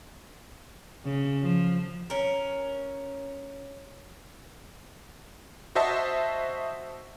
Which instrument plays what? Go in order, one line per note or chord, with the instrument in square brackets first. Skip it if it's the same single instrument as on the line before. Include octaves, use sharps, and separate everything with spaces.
[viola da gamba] C#3
F3
[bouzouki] C#4 A#4
[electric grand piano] F#4 C5 D#5 E5 A5